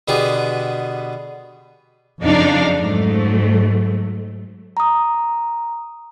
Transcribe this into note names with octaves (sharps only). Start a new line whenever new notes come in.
B2 D3 B3 G4 G#4
F2 C#3 F#3 D4 D#4 F5
G#2 F#3 A3
A#5 D#6